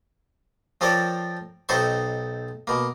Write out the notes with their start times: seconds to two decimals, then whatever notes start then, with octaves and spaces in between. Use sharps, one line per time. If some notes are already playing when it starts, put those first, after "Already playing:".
0.81 F3 C4 A4 A#4 C#5 D5
1.69 B1 C4 D#4 A4 C5 C#6
2.67 B2 A#3